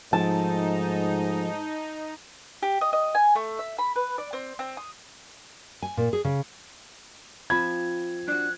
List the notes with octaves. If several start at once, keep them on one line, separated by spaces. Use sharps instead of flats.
G#2 F3 A3 D#4 A5
G4
D#5
D#5
G#5
A3
E5
B5
B4
D5
C4
C4
D#6
G#5
A#2
G#4
C#3
F3 C4 B5 G#6
D4 F#4 F#6